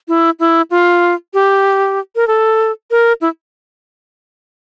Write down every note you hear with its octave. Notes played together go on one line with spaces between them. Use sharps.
E4
E4
F4
G4
A#4
A4
A#4
E4